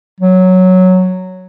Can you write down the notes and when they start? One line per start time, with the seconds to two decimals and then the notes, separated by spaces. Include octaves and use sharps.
0.20 F#3